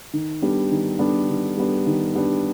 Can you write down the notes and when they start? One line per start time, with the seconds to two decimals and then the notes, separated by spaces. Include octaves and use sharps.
0.13 D#3
0.42 G3 B3 D4
0.71 D#3
0.99 G3 B3 D4
1.29 D#3
1.57 G3 B3 D4
1.86 D#3
2.14 G3 B3 D4